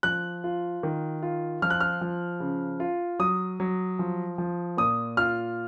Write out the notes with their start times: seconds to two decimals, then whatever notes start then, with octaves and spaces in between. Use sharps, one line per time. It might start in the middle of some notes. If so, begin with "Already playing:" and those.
0.03 F3 F#6
0.44 F4
0.83 D#3
1.23 F4
1.62 F3 F6
1.70 F#6
1.80 F6
2.01 F3
2.40 C#3
2.80 F4
3.19 F#3 D#6
3.60 F#3
3.99 F3
4.38 F3
4.77 A#2 D#6
5.17 F4 F6